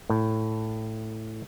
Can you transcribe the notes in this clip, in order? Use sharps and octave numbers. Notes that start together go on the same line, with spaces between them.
A2